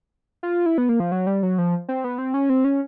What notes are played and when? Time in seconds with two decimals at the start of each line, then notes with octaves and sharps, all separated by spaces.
0.43 F4
0.66 E4
0.78 B3
0.89 A#3
1.00 F3
1.12 F#3
1.27 G3
1.43 F#3
1.58 F3
1.89 C4
2.04 B3
2.18 C4
2.34 C#4
2.49 C4
2.64 C#4